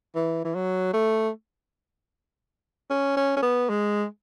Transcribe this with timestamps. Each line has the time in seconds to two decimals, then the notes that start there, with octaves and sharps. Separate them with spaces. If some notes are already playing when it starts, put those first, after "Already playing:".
0.15 E3
0.44 E3
0.55 F#3
0.94 A3
2.90 C#4
3.17 C#4
3.36 C#4
3.42 B3
3.70 G#3